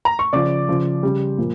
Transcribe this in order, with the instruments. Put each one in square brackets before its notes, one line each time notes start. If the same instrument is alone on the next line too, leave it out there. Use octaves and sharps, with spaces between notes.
[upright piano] A#5
C#6
C#3 F3 D5 D6
C#3 F3
C#3 G3
A#2 F3